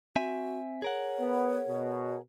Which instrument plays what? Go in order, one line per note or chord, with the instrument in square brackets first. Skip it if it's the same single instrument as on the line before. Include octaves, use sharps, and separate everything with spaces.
[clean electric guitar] C4 E5 G#5 [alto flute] F#4
[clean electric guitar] G#4 A#4 F#5 [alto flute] C#5
[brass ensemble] B3
B2